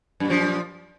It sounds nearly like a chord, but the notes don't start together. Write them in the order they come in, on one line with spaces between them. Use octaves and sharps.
F#2 A#2 F3